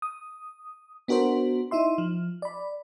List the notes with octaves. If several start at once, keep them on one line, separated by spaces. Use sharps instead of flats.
D#6
B3 D4 F#4 A#4 C5
D#4 E4 E5 C6
F3
D5 B5